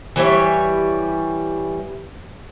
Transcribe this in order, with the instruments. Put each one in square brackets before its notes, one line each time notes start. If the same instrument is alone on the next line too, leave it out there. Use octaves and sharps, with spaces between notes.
[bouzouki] E3 G3 C#5 E5